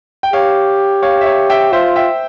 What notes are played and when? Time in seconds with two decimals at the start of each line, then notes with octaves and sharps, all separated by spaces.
0.23 G5
0.33 G4 C#5 F5
1.02 C#5 F5
1.21 E5
1.26 C#5 F5
1.50 E5 G5
1.72 F4 C5 E5
1.96 E5 G5